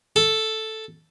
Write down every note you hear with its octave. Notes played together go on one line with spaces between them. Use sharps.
A4